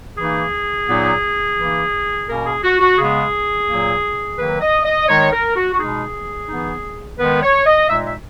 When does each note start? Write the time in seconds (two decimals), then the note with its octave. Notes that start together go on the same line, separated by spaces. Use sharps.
0.18 E3 A#3 D#4 G#4
0.88 A#2 F#3 B3 D#4
1.58 E3 A#3 D#4
2.28 B2 A#3 C#4 A#4
2.46 G#4
2.63 F#4
2.80 F#4
2.98 C#3 G#3 B3 G#4
3.69 A#2 F#3 A#3
4.38 D#3 F#3 A#3 B4
4.61 D#5
4.85 D#5
5.08 D#3 G#3 D#4 C#5
5.32 A#4
5.56 F#4
5.74 F#4
5.79 B2 G#3 D#4 G#4
6.48 E3 B3 D#4
7.18 D#3 G#3 B3 B4
7.43 C#5
7.66 D#5
7.88 A#2 G#3 D#4 E5
8.05 E5